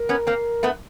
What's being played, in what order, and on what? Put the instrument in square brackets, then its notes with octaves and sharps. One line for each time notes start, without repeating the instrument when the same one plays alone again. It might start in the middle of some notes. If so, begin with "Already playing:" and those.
Already playing: [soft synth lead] A#4
[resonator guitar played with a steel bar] B3 C#4
A#3 C4
A3 B3